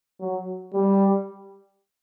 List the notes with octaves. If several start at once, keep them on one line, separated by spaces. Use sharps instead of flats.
F#3
G3